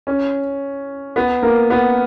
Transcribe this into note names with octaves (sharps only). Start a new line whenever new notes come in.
C#4
B3
A#3
B3